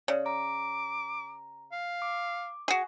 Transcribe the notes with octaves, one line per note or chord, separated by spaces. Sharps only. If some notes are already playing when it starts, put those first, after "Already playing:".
C#3 C#5 D5
A#5 D6
F5
D6
F#4 G#4